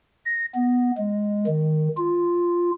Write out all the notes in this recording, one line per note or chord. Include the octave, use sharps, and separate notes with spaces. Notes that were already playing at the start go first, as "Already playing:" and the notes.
A#6
B3
G#3
D#3
F4